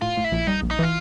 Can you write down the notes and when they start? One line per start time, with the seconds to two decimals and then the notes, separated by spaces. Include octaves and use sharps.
0.01 A2 F4
0.17 A2
0.24 E4
0.32 A#1
0.47 G3 D#4
0.62 A#1
0.71 D#4
0.79 E3 F4